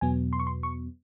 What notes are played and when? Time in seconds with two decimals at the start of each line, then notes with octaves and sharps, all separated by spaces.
0.01 E2 B2 F#3 B3 G#5
0.33 C6
0.40 C#6
0.47 C6
0.63 C#6